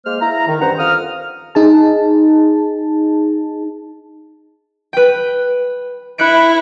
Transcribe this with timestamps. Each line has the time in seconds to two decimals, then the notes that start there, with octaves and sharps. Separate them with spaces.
0.06 G#3 A#3 C5 F6
0.21 E4 F5 A#5
0.48 D#3
0.61 G2 C#4 C5 F#5 A#5
0.79 F2 F5 D#6 F6
1.55 D#4 G#4 A5
4.93 B4 G5
6.18 E4 F#6 C#7 D7